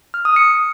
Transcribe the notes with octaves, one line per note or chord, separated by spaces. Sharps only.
F6
D#6
C#7